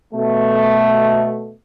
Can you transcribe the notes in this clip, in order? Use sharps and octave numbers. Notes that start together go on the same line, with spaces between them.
B2 A3